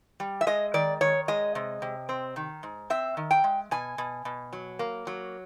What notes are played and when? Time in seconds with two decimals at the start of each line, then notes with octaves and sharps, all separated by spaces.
0.20 G3
0.41 E5
0.47 G#3 D#5
0.74 D#3 D5
1.01 D#3 C#5
1.28 G#3 D#5
1.55 C3
1.82 C3
2.09 C4
2.36 D#3
2.63 G#2
2.90 C4 E5
3.17 D#3
3.31 G5
3.44 G#3
3.71 B2 G#5
3.98 B2
4.25 B2
4.53 F#3
4.79 A#3
5.07 F#3